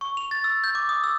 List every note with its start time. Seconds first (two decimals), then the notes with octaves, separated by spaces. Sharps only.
0.01 C#6
0.17 F7
0.31 A6
0.44 E6
0.64 G6
0.75 D6
0.89 D#6
1.04 E6